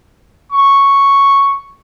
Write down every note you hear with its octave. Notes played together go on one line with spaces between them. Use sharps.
C#6